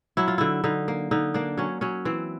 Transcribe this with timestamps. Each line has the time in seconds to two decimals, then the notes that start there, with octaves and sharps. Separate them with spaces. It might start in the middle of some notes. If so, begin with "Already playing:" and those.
0.17 F#3 E4
0.28 F4
0.38 D3 E4
0.64 D3 D#4
0.88 A#3
1.11 D3 D#4
1.34 A#3 D4
1.58 F#3 C#4
1.81 F#3 C#4
2.05 E3 C4